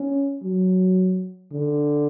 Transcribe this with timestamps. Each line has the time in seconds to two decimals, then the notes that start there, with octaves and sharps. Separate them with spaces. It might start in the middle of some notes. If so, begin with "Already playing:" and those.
Already playing: C#4
0.43 F#3
1.52 D3